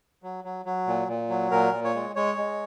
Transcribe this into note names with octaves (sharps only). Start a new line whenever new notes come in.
F#3
F#3
F#3
A#2
A#2
F#3
A#2 A#4
A#2
C#5
G#3
G#3 C#5
G#3